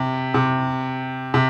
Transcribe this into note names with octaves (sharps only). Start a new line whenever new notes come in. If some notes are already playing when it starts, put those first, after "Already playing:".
Already playing: C3
C3
C3